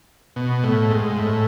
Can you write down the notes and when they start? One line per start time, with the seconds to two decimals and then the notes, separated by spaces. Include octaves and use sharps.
0.36 B2
0.64 A2
0.91 G#2
1.19 A2